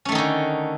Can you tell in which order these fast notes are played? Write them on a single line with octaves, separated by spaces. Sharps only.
C#4 A3 D#3 D#4 D3